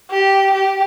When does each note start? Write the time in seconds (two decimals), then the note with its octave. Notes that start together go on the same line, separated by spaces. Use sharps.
0.11 G4
0.53 G4